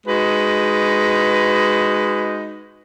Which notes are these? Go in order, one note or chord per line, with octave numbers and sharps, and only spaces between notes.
G#3 D#4 F#4 B4